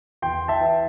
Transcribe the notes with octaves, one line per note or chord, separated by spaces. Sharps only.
E2 G5 C6
E5 A5
E3